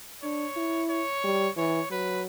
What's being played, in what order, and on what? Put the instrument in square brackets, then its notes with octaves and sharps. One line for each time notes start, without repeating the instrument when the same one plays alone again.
[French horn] D4 [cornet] C#5
[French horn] E4
[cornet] C#5
[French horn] G3
[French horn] E3 [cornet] C#5
[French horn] F#3 [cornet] B4